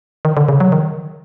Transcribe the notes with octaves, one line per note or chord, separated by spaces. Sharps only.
D#3
D3
C#3
F#3
D#3